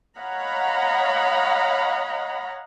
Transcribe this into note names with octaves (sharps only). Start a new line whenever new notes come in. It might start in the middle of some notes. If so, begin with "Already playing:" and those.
C#5 D#5 F5 F#5 A#5 B5